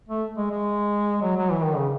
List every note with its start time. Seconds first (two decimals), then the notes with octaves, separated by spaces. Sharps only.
0.09 A3
0.37 G#3
0.51 G#3
1.22 F#3
1.37 F#3
1.50 E3
1.64 D#3
1.76 C#3